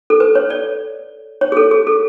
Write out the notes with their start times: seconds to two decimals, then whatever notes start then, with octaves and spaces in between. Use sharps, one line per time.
0.10 A4
0.20 B4
0.35 C#5
0.50 D5
1.41 C#5
1.52 G#4
1.57 A4
1.71 G#4
1.87 A4